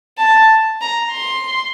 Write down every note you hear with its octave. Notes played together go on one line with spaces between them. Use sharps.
A5
A#5
C6